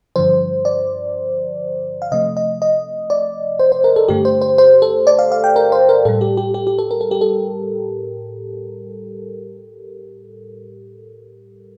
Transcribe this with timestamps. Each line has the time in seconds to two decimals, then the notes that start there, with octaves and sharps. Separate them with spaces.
0.16 G2 D3 F3 C5
0.65 D5
2.02 F5
2.12 C3 F3 A3 D#5
2.37 D#5
2.62 D#5
3.10 D5
3.59 C5
3.72 C5
3.84 A#4
3.96 A4
4.08 G2 D3 A3 G4
4.25 C5
4.42 C5
4.58 C5
4.82 A4
5.07 D5
5.19 F5
5.32 F5
5.44 G5
5.56 A#4
5.72 C5
5.89 A#4
6.05 A2 G3 A4
6.21 G4
6.37 G4
6.54 G4
6.67 G4
6.79 A4
6.91 A#4
7.01 A4
7.11 G4
7.21 A4